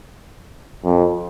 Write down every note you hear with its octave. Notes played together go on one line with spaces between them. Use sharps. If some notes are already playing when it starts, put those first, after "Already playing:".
F2